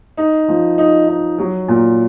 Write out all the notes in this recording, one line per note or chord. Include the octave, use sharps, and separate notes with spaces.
D#4
F3
D#4
D#4
F#3
A#2